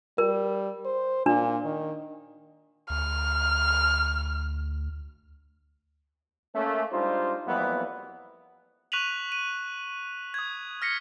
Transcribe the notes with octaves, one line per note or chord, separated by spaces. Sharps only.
G3 A#4
C5
A#2 D4
D#3
D2 F6
A3 A#3 C#4
G3 G#3 D4 D#4 F4 C5
F2 E3 F#3 G3 A#3 B3
C#6 F#6 B6 D#7 F7 F#7
D#7
D#6 G#6
F6 A#6 B6 C#7